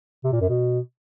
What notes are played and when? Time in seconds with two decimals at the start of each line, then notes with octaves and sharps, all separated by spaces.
0.24 C3
0.32 A#2
0.41 F#2
0.49 B2